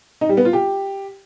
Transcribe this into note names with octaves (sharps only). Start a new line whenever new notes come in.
D#4
G3
B3
F4
G4